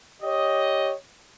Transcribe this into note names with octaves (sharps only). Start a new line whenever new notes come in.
G4 C#5 D#5